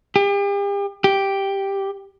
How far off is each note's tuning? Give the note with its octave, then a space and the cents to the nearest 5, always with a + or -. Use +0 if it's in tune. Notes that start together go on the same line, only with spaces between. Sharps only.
G4 +40
G4 +0